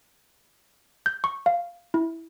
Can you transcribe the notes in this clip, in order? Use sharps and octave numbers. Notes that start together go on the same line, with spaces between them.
G6
C#6
F5
E4